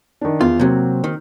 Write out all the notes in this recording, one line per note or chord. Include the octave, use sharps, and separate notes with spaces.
D#3 D4
E2 F4
C3 F#3 A#3 C4 F#4
D#3